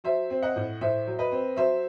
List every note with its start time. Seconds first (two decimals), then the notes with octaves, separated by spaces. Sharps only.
0.04 F#3 C5 E5
0.30 C4
0.42 D#5 F#5
0.56 A2
0.81 A2 C5 E5
1.07 F#3
1.19 B4 D#5
1.32 C4
1.56 F#3 C5 E5